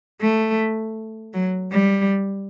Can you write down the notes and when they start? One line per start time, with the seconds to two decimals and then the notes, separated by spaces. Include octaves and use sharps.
0.21 A3
1.34 F#3
1.72 G3